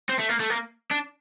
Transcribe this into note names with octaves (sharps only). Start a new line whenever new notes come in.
C4
A3
A#3
A3
A#3
D4